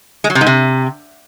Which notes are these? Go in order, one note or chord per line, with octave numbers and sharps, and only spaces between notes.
G#3
F#3
C3
G#2
C3